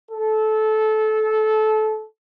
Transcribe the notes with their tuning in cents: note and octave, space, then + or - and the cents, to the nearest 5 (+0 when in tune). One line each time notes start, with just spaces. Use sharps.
A4 -20